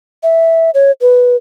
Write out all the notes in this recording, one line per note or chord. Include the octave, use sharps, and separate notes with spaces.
E5
C#5
B4